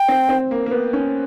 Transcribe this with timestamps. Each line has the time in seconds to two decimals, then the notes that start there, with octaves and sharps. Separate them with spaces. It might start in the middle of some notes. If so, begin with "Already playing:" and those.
Already playing: G5
0.08 C4
0.29 C4
0.51 A#3
0.66 A#3
0.71 B3
0.93 C#4